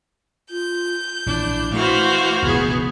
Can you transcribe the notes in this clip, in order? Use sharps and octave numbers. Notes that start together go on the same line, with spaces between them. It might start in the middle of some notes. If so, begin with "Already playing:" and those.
F4 G6
A#1 E3 D4 E4
E3 A3 F#4 C5 F5
E1 C#2 G#2 B3 G#4